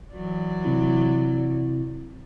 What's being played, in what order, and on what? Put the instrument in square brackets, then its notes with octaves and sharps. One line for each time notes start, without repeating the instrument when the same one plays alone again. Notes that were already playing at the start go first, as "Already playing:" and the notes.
[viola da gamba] E3 F#3 D5
[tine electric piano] C3 C4 E4